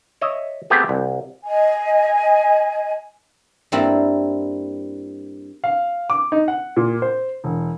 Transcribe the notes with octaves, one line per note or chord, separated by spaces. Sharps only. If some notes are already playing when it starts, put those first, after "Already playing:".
C#5 D#5 E5
A3 B3 C4 G4 G#4
C2
D#5 G#5
G2 G3 A#3 C4 E4
F5
D6
D#4
F#5
A#2
C5
E1